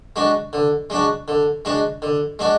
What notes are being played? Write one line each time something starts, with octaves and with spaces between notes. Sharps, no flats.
G#3 D4 F#4
D3
G#3 D4 F#4
D3
G#3 D4 F#4
D3
G#3 D4 F#4